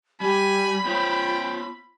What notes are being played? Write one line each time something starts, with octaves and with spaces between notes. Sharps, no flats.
G3 G4 G#5 B5
B3 F4 C5 C#5 G5